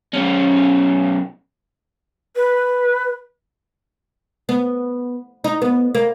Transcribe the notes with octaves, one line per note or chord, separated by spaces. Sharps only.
B1 C#4
B4
B3
D#4
B3
A#3